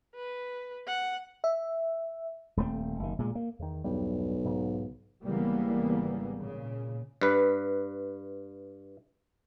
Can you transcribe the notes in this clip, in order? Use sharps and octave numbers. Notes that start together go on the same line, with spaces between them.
B4
F#5
E5
D#1 A3 A#3 C4
F#1 D#3
A#2 G#3
A#3
E2 D#3
B1 E2 G2 G3
G#2 C#3
G#1 C#3 E3 G3 A#3 B3
A#2 C#3
G2 B4